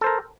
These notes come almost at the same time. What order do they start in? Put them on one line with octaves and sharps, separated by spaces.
A4 C5 A#4